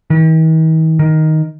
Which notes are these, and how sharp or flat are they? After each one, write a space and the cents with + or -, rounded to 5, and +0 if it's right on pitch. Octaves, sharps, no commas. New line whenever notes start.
D#3 +45
D#3 +5